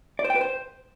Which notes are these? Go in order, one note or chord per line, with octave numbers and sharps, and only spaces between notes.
D5
C5
G5
B4
C5